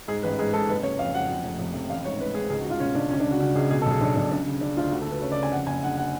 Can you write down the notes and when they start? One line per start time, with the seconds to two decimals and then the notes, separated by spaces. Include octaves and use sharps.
0.08 G#2 G#4
0.23 A1 B4
0.39 G#2 G#4
0.53 G#2 A4
0.69 F#1 B4
0.83 F#1 C#5
0.99 F2 F5
1.14 F2 F#5
1.29 F2
1.44 F1
1.59 F1
1.74 F1
1.90 A1 F5
2.05 G#2 C#5
2.20 G#2 B4
2.34 G#2 G#4
2.50 C#2 G#4
2.60 F#4
2.65 C#2 F4
2.80 B2 C#4
2.95 C#2 D4
3.11 C#2 C#4
3.20 D4
3.26 C#3 F#4
3.40 C#3 F#4
3.55 C#2 G#4
3.70 B2 G#4
3.82 A4
3.85 B1
3.91 G#4
4.01 B1 D4
4.16 B1 D4
4.32 C#3 D4
4.47 C#3
4.61 C#3 D4
4.77 D2 F4
4.92 D2 F#4
5.01 A4
5.07 D2 B4
5.21 C#3 C#5
5.32 D5
5.37 C#3
5.43 G#5
5.52 F2 F#5
5.67 F#1 G#5
5.83 D3 F#5
5.97 F#5